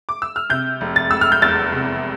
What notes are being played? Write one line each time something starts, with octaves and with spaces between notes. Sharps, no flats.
D6
E6
F6
C3 G6
F1
A6
F1 E6
F6
G6
E2 A6
C3